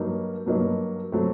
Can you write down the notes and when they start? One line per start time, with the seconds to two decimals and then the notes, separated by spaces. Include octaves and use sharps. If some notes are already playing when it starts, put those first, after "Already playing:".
Already playing: G2 F#3 A#3 D#4
0.46 G2 F#3 A#3 D#4
1.12 F#3 A3 C4